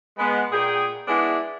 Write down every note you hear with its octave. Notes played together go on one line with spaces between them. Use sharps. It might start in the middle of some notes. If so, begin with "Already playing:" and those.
G#3 B3
A#2 G#4 G5
G#3 B3 D4 E4 D5